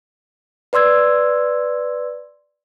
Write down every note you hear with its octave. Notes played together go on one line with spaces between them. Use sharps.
B4 D5 C6 E6 G#6